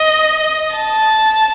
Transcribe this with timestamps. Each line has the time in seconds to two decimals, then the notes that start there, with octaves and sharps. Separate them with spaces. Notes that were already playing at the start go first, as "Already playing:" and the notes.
Already playing: D#5
0.75 A5